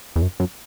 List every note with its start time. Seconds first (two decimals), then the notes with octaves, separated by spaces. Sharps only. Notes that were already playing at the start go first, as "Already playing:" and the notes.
0.16 E2
0.22 F#2
0.40 F#2